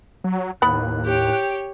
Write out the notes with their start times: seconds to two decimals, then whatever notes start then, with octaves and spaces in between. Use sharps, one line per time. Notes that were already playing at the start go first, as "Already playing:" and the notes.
0.24 F#3
0.62 D#2 A2 B3 B5 F#6
1.05 G4 C#5 G5